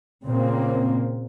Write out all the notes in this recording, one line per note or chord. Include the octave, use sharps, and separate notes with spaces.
A#2 C#3 A#3 C4